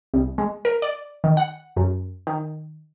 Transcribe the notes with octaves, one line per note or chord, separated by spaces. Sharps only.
C2
G#3
A#4
D5
D#3
F#5
F#2
D#3